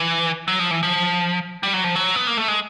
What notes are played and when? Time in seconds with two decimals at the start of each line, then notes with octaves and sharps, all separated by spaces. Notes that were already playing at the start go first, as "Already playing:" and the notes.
Already playing: E3
0.48 F#3
0.59 F3
0.71 E3
0.83 F3
1.63 G3
1.74 F#3
1.84 F3
1.95 F#3
2.16 B3
2.27 A#3
2.37 A3
2.48 G#3